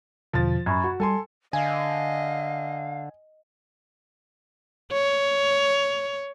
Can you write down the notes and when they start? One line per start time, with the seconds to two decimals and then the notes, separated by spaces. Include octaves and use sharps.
0.33 E2 B2 D3 F3 A6
0.66 F#2 B5 C#6 G#6
0.84 F#4
1.00 G3 A4 G#5 C6
1.53 D3 D#5 F5 G#5
4.93 C#5